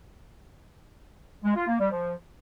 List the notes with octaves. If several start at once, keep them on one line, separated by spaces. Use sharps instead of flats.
G#3
F4
A#3
G3
F3